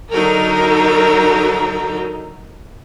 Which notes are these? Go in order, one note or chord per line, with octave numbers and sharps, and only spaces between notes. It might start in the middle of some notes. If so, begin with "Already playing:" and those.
D3 F#3 D#4 A4 A#4 A#5